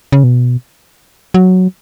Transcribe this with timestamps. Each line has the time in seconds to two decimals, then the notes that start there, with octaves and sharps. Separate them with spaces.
0.12 C#3
0.24 B2
1.34 F#3